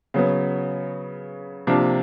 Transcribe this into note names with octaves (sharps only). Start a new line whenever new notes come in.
C#3 F#3 B3
C3 F3 A#3 D4